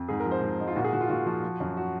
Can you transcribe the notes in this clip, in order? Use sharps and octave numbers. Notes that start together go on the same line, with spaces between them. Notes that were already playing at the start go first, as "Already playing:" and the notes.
Already playing: F2
G#2 G#4
A#4
F3
C5
G#2
G#2 D#4
F4
A#2 F#4
G#4
A#2 F#4
F4
A#2 F#4
F3 F#4
F3
F#2
F#4